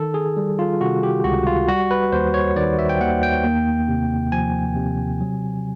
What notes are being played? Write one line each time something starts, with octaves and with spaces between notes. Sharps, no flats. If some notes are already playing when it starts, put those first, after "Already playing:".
Already playing: D#3 A4
G#4
G3
F4
C3 F#4
G4
C#2 F#4
F4
G3 F#4
B4
D#2 C5
C#5
D#3 D5
E5
G5
D#2 F#5
G5
A#3
C3
F3 G#5
C3
F#3